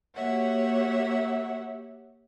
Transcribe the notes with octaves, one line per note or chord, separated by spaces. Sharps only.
A#3 F#4 G4 C#5 E5 F#5